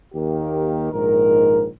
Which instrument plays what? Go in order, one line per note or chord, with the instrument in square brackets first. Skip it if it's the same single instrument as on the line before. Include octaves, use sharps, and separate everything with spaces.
[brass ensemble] D#2 D#3 A#3 G4
A#1 G#2 D#3 A#4